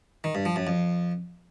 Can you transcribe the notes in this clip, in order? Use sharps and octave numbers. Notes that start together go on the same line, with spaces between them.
D#3
G2
F3
F#2
F2